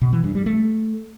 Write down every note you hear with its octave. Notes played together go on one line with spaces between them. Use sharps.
B2
E3
G2
G3
A3